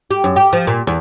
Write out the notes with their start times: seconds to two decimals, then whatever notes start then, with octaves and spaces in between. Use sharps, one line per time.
0.11 G4
0.24 F#2
0.36 G4
0.53 F3
0.67 A#2
0.87 E2